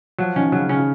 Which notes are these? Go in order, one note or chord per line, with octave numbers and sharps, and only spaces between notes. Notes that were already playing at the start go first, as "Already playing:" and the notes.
F3 F#3
D#3 C#4
C#3 F#3
C#3 C#4